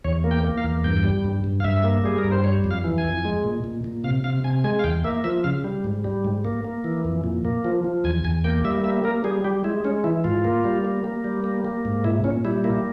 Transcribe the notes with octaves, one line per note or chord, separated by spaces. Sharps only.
E2 C#5
A#3
G5
A#3
F5
E2
G2 G5
G3
G2
G2
F5
G2 E5
A#3
G3 G#4
A#4
G2
C5
G3 C#5
F2
F5
E3
G#5
F2
G#3
A#2
A#2
A#2
C3 F5
C3 F5
C3 G#5
G#3 G#5
F5
E2 G5
A#3 E5
F3 E5
C#3 F5
G3
G#2
G3
G#2
A#3
A#3
E3
F2
A#2
A#3
F3
F3
E2 G#5
E2 G#5
A#3 G5
G3 E5
A#3 E5
A#3 A#4
G3 G#4
G3 G4
G#3 E4
G#3 C#4
E3 E4
G#2 F4
A#3
G3
A#3
A#3
G3
A#3
A#3
G#2
A#2 E4
A#2 C#4
G3 E4
A#3 E4